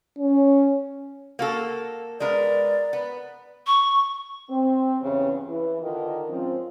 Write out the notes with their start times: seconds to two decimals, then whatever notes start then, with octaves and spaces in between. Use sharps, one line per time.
0.19 C#4
1.39 A#3 F#4 A4
2.20 G#3 B3 A#4 D5
2.93 B3
3.67 C#6
4.50 C4
5.01 E2 G2 C#3
5.47 E3
5.82 D3 D#3 F4 A#4
6.30 G#2 F3 C4 C#4 F4